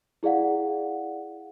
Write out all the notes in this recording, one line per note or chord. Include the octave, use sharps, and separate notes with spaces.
E4 G#4 D5 F5 F#5